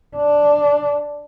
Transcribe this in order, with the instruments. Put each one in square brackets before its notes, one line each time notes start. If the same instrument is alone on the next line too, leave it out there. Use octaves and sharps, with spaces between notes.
[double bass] D4